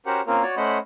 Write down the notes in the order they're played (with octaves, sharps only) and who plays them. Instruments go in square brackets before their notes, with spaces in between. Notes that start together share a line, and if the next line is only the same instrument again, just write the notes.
[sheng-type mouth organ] C#4 F#4 G4 A#4 C5 F#5
A#3 C4 C#4 F4 A#4
F#4 C#5 D5
A3 C#4 C5 D#5 F#5 B5